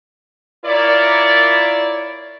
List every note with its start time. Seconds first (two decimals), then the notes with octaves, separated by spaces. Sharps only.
0.65 E4 F4 A#4 C#5 D5